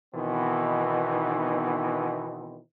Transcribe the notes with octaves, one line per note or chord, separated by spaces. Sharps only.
B2 D#3 E3 B3 C4 D#4